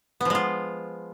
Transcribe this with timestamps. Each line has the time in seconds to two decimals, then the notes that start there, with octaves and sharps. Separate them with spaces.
0.21 B3
0.25 F3
0.30 G#3
0.35 F4